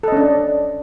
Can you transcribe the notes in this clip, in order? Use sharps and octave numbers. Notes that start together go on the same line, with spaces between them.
C#4 D4 A4 D#5